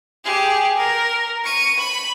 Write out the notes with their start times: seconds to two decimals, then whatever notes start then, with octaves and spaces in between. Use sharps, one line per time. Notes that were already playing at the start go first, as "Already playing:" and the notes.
0.25 G4 G#4
0.77 A#4
1.44 C#6 D#7
1.78 B5